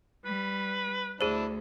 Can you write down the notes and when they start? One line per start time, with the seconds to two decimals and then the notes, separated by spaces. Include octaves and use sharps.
0.25 G3 B4
1.21 D2 D4 E4 G#4 C5